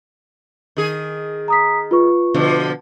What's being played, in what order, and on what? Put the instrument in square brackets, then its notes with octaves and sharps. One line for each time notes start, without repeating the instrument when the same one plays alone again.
[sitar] D#3 G#4
[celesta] A#5 D#6 B6
F4 B4 C#6
[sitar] B2 D3 F3